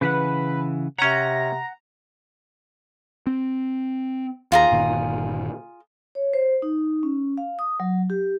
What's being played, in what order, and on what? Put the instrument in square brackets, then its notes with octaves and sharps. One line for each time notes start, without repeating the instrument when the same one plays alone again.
[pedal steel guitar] C#3 E3 F#5 [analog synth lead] B4
[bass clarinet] C3 [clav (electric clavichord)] C#4 C#5 [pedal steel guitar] F#5 [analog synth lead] A#5
[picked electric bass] C4
[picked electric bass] D#2 [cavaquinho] F4 G#4 A#5
[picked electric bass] G1 A#2 D#3
[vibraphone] C#5
C5
D#4
C#4
F5
D#6
F#3
G4